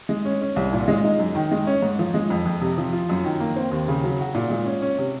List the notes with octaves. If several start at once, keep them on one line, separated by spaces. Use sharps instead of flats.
G#3
C#4
C#4
C2
A#2
G#3
D#4
F#2
D#3
G#3
C#4
G#2
F3
G#3
F2
F2
C3
F3
F4
F#2
D#3
A#3
C4
D#2
C#3
F#3
F#4
A#2
G#3
C#4
C#4
C3